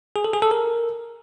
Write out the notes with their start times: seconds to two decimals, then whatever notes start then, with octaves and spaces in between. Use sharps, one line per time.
0.16 G#4
0.24 A4
0.33 G#4
0.42 A4
0.51 A#4